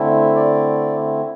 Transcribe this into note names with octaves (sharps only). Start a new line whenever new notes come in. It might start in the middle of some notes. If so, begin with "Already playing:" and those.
Already playing: D3 A3 C4 E4
D5